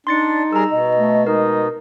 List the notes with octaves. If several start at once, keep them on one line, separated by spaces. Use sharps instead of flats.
D4 D#4 C6 A6 C#7
G3 G#4 A#4 A#5 E6
B2 D#5
A3
G#3 D#4 A#4